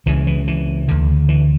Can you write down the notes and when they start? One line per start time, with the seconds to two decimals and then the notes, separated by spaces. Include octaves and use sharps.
0.06 C#2 C#3 E3
0.27 E3
0.47 E3
0.88 D2 D3
1.29 E3